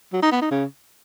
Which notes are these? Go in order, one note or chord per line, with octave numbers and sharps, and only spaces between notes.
F#3
D#4
B3
D#4
C#3